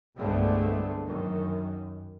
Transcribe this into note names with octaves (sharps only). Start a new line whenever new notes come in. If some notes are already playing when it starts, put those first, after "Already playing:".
C2 G2 D3 G#3 A3 B3
F#2 D#3